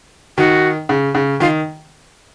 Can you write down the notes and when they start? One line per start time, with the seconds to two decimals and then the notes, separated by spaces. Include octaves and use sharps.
0.37 D#3 F#4
0.89 C#3
1.15 C#3
1.40 D#3 F4